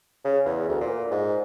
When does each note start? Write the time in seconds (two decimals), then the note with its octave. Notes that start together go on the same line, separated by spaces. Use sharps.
0.25 C#3
0.45 E2
0.68 D2
0.81 A#2
1.11 G#2